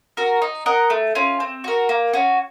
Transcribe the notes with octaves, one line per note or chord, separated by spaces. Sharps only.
F#4 A#4
D#4
A#4 D#5 F#5
A3
C#4 F4
C4
F#4 A#4
A#3
C#4 F#4